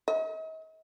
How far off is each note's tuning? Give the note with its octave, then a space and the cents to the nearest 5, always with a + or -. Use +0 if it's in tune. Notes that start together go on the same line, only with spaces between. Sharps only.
D#5 +45